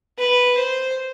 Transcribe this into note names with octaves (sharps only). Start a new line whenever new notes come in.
B4
C5